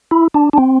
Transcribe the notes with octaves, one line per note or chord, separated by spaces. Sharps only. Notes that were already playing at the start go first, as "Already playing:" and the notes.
E4
D4
D4
C4